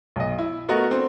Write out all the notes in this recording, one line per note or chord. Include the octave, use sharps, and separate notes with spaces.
B1 D#5
E4
A3 B3 F#4 A#4 D#5
C4 D4